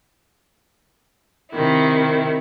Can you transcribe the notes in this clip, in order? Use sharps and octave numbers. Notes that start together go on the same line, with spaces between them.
C3 D#3 E4